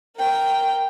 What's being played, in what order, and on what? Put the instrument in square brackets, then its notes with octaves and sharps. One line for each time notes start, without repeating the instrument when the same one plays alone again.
[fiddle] A#4 G5